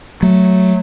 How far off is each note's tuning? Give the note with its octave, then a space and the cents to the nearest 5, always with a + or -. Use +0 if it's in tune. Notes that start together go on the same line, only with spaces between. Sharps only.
F#3 +0 A3 +0